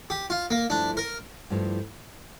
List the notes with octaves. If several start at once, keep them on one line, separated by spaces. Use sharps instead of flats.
G4
F4
A#3
G2 F3 A3 D4 E4
A#4
G2 F3 A3 E4